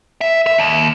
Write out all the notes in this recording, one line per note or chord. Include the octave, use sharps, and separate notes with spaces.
E5
E5
D#2